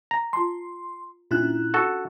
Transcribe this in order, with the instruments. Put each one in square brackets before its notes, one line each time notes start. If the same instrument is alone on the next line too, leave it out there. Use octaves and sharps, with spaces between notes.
[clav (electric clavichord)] A#5
[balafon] F4 A5 [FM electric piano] C6
[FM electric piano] A#2 E4 F#6 [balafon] C#4 D4 F4
[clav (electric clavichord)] F#4 A4